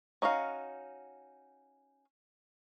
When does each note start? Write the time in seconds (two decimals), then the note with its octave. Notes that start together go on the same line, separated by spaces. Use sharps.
0.22 C#4 D#4 F#4 F5